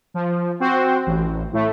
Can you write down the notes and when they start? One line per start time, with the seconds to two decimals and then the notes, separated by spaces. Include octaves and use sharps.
0.14 F3
0.60 C4 F#4 C5
1.07 A1
1.53 A2 A3